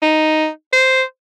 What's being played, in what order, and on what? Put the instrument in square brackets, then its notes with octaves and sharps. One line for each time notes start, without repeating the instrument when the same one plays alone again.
[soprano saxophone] D#4
C5